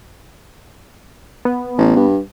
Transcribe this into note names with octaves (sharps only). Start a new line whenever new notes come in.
B3
A1
G2